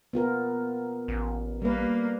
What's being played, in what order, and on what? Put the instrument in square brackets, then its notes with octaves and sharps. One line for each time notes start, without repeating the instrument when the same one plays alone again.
[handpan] B3 F4 A#4
[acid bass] A1
[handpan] G3 B4 [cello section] A#3